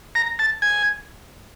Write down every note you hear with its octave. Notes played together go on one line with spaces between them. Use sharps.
A#5
A5
G#5